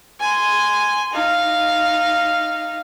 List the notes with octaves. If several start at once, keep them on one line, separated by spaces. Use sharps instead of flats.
G#5 C6
D#4 F5